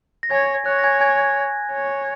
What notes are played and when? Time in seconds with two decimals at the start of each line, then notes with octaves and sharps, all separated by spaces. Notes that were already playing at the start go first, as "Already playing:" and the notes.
0.23 A#6
0.31 C#5 G#5 G#6
0.66 C#5 F#6
0.79 A#6
0.84 G#5 G#6
1.01 G#5 G#6
1.72 C#5